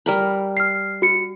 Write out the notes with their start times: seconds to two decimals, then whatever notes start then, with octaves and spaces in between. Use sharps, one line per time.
0.06 G3 A#4 B5
0.57 F6 C7
1.02 F#4 C#7